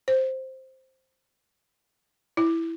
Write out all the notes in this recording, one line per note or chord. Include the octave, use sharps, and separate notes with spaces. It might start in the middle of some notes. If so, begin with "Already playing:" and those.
C5
E4